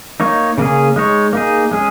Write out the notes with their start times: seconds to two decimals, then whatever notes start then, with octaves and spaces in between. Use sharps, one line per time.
0.20 A#3 D#4 C#5
0.58 C#3 A#3 C#4 G#4
0.96 G#3 D#4 C#5
1.33 A#3 D#4 G#4
1.71 G#3 C#4 G#4